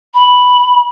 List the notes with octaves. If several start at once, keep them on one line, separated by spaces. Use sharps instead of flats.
B5